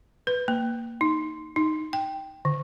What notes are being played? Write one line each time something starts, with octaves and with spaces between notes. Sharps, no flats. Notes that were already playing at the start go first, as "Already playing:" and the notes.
B4
A#3
D#4
D#4
G5
D3